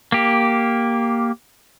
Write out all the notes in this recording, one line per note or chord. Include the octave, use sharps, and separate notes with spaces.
A#3 G4